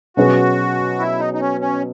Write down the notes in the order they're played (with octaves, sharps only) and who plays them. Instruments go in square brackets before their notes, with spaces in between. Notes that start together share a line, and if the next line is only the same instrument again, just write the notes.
[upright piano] B2 F#3 C#4 G#4 B4 [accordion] F#4
[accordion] E4
D#4
D#4
C#4
C#4